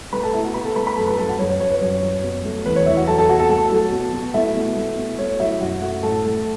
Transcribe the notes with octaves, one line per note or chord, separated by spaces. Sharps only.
A3 B4 B5
A4 A5
B2 E4 E5
F#4 F#5
B2 B4 B5
A4 A5
A3 B4 B5
B4 B5
F#2 A4 A5
B4 B5
F#2 A4 A5
F#4 F#5
F#2 C#5
C#5
F#2 C#5
B4
F#2 C#5
F#2
B2
A3
E2 B4
C#5
E2 E4 E5
F#4 F#5
F#3 A4 A5
A4 A5
B2 F#4 F#5
A4 A5
A3 A4 A5
F#3
B2
B2
A3 E4 E5
B2
A3
B2
A3 C#5
F#3 E4 E5
F#2 F#4 F#5
A3 F#4 F#5
A2 A4 A5
A3